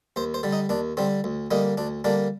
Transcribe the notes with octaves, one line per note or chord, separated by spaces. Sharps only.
D#2 C5
C5
D3 G3
D#4
D#2 D4
D3 G3 C4
D2
D3 G3 A#3 D#4
D2 D4
D3 G3 A#3 D4